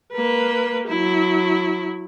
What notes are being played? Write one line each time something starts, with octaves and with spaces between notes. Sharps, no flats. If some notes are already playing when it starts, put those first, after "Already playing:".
A#3 B4
F#3 E4